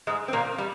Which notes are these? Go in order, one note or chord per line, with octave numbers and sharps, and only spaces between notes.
G#2 G#3
C4
A#2 A#3
G3